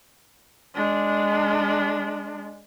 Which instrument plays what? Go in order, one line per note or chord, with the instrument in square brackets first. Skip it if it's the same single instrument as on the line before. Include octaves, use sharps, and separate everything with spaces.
[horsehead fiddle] G#3 D4